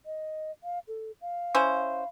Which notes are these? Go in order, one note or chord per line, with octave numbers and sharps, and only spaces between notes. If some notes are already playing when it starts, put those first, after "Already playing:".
D#5
F5
A4
F5
C#4 E4 C5